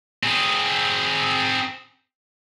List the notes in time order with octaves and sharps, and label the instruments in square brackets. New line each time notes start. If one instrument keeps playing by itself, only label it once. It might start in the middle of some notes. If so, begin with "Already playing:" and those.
[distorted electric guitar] C4 G#4